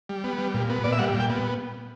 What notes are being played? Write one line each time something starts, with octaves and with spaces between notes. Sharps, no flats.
G3
B3
G3
A#2
B3
A#2 D5
E5
G3 F#5
A#2
G5
B3